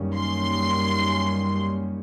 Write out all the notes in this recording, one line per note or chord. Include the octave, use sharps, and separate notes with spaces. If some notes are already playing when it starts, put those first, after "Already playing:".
Already playing: F#2 D#3 G3 A#3 C#4
C6